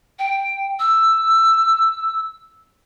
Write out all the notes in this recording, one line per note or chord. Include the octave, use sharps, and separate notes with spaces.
G5
E6